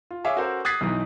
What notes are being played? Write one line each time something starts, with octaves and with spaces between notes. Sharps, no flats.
F4
G#4 C#5 E5 F5 D6
C#4 F#4 A4 A#4 C5
D#6 F#6 G#6 A6 B6 C7
B1 E3 D#4 D#6